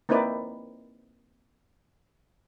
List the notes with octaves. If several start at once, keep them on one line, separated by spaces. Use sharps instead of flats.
A#3 C4 D#4 E4 B4 D5